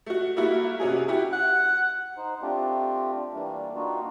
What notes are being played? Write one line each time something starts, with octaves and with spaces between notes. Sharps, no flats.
A3 F#4
G3 A3 A#3 E4 F#4
C3 C#4 F#4 G#4
E4 F#4 G4
F#5
D#4 C5
A3 C4 D4 F4 G4
E3 G3 A3 A#3 D4
G3 A#3 D4 D#4 F4 F#4